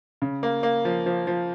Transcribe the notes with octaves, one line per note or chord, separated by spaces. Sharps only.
C#3
A#3
A#3
F3
F3
F3